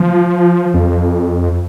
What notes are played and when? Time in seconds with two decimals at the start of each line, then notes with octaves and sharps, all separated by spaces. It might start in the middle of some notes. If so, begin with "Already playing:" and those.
Already playing: F3
0.74 F2